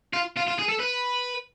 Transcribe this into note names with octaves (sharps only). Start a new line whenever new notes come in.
F4
F4
F4
G#4
A4
B4